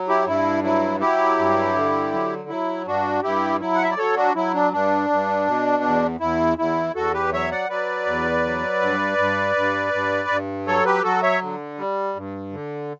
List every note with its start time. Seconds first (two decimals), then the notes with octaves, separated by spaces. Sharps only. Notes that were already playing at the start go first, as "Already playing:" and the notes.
Already playing: F#3
0.08 E4 G4
0.26 G2 E4
0.63 F#3 E4
1.00 F#3 E4 G4
1.39 G2
1.75 D3
2.12 F#3
2.49 F#3 E4
2.86 G2 D4 F#4
3.23 G2 E4 G4
3.60 F#3 E4
3.75 F#5
3.83 E5
3.91 D5
3.98 F#3 A4 C#5
4.16 D4 F#4
4.35 F#3 E4
4.54 D4
4.72 G2 D4
5.10 G2
5.47 B2
5.84 E2
6.20 E2 E4
6.58 E2 E4
6.95 E2 F#4 A4
7.13 G4 B4
7.32 F#3 C#5 E5
7.51 D5 F#5
7.69 F#3 B4 D5
8.06 E2
8.45 F#3
8.81 G2
9.18 G2
9.56 G2
9.93 G2
10.29 G2
10.67 F#3 A4 C#5
10.85 G4 B4
11.03 F#3 F#4 A4
11.23 C#5 E5
11.42 D3
11.78 G3
12.16 G2
12.53 D3